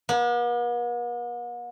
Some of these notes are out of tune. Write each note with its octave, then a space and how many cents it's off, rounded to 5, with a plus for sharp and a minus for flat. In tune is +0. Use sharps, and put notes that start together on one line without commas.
B3 -45